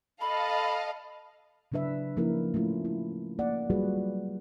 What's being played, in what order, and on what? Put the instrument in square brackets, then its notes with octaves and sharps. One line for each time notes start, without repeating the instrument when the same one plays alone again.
[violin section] A4 D#5 F5 [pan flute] B5
[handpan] C#3 F#3 D4 B4 E5
F3 A#3 C#4 D#4 E4 A#4
A3 C#4 E4 F4
E4
A#3 D5 F#5
F#3 G3 F4 F#4 G#4 B4